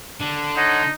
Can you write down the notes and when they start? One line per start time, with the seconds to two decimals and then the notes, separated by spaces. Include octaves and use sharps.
0.20 D3 D4
0.57 D#4 C#5 D#5 F#5